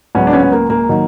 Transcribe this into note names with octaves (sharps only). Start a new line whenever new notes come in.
C#2 C#3 F#3 B3 C#4
D4
B3 C#4
B3
A#3
A#3
D#3 F#3